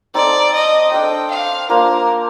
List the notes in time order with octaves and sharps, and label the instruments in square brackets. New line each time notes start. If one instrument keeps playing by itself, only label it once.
[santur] C4 D#4 A4 C5 [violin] D5
[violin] D#5
[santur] D4 A4 C5 [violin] G5
[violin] F5
[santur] A#3 D4 F4 C5 [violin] A#4